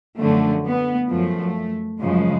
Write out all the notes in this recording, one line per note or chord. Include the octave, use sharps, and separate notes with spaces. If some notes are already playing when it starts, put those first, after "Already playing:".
F#2 D3 F3 A3
B3
F#2 F3 A3
F#2 C#3 F3 G#3